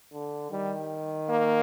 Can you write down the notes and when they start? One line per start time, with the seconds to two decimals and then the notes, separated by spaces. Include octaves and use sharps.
0.13 D3
0.51 D#3 G3
1.29 A#3